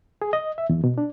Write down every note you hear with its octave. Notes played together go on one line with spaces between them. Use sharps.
G#4
D#5
E5
E2
B2
D4